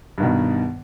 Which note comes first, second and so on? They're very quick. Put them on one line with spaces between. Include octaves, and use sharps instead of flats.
G2 D#3 B2